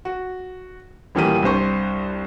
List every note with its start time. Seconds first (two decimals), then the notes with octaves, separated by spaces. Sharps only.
0.05 F#4
1.15 D#1 E3 G3 A#3 G4 D#7
1.43 C2 G2 C5 C#6